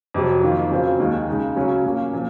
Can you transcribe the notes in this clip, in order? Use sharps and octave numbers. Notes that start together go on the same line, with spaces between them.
F2 C3 F#3
F2 D#3 A#3 F4
C#3 F#3 C4 F4
D#2 D#3 G#3 D#4
C#3 G#3 D#4
C#2 C#3 F#3 C#4
A#2 F#3 A#3 C#4
A#2 F3